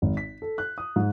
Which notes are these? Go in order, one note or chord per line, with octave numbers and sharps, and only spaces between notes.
G#1
B6
A4
F#6
D#6
G#2